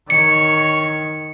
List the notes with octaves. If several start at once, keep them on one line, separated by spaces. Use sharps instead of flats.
D#3 C#5 C#7